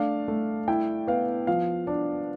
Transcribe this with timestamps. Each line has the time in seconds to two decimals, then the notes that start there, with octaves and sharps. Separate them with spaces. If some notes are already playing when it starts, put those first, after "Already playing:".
Already playing: A3 D4 F5
0.28 A3
0.68 E4 G5
1.07 B3 F5
1.47 F3 F5
1.87 D4